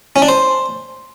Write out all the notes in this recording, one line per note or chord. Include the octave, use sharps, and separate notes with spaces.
C#4
D4
C5